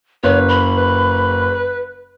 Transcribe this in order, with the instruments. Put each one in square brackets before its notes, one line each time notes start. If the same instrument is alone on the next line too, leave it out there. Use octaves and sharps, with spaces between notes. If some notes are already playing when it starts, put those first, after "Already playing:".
[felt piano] F#1 [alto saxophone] B4 [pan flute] C#5
[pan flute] B5
[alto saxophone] B4